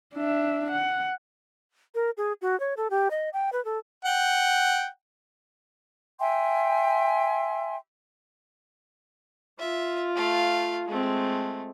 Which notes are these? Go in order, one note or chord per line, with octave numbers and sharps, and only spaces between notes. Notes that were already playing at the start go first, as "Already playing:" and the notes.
D4 E5
F#5
A#4
G#4
F#4
C#5
A4
G4
D#5
G5
B4
A4
F#5 G5
E5 G5 G#5 C6
F4 E5
A3 F5
G#3 A3 C4